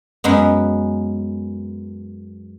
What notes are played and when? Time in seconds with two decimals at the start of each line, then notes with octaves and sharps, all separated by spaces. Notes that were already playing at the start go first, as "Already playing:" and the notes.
0.24 F#2 G#3 B3